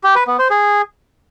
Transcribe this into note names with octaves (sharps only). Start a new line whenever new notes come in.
G4
B4
B3
C5
G#4